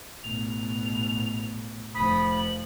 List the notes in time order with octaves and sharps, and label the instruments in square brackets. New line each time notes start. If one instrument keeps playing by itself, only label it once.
[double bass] A1 B2 [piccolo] F7
[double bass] F1 F3 [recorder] B5 [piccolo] D#6
[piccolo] F#7